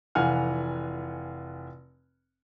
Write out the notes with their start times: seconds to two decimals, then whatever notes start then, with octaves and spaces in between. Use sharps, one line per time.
0.15 F1 E3 F4 F#5 G#5 F6